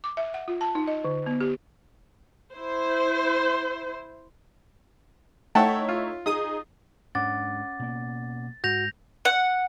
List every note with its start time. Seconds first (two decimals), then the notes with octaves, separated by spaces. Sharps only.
0.04 D6
0.17 E5
0.34 F#5
0.48 F4
0.61 A5
0.75 D#4
0.87 D#5
1.04 D3
1.26 B3
1.41 G4
2.52 E4 C5
5.55 A3 D#4 E4 C#5 F#5 G5 A5
5.89 F4
6.26 D#4 G#4 D#6
7.15 G#2 C#4 D4 F#5 D6 A6
7.79 B2 A#3
8.64 G#2 F#4 G6 A#6 F7
9.25 F#5